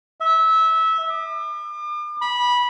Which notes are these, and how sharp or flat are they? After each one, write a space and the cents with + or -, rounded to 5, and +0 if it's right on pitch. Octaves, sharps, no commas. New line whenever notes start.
E5 -20
D6 +40
B5 -15